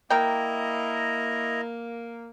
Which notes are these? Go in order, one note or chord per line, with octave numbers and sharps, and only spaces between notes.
A#3 E4 A#4 D#5 G5 A#5